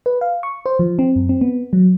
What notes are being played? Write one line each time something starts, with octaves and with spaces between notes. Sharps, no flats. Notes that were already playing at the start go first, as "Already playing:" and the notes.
B4
F5
C#6
C5
F3
C4
F#2
C4
B3
F#3